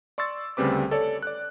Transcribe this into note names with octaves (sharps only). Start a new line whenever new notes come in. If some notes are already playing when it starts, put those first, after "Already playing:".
D5 C6 C#6 E6 A6
D2 C#3 G3 C4 B4 D6
A4 C#5 D5
D5 F#6